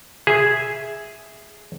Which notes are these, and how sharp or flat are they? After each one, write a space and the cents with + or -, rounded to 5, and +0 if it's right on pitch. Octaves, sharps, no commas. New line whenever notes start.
G#4 +0 E5 +0